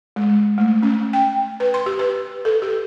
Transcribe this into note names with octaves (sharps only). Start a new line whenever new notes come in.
G#3
A3
C#4
G5
B4
C6
G4
B4
A4
G4